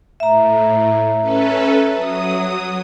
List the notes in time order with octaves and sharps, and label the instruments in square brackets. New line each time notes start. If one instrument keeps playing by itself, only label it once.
[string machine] A2 [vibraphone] E5 A#5
[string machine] C#4 A4 B4
F#3 D#6